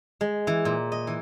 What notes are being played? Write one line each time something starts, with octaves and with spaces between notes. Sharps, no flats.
G#3
E3
A#2
D#5
E3